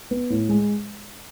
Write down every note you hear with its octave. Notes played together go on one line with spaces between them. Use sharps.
B3
A2
G#3